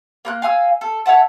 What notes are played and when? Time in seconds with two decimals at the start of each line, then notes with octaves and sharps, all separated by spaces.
0.25 A#3 A#5 F#6
0.42 F5 G#5 D#6 E6
0.81 A4
1.06 C#5 E5 F#5 A5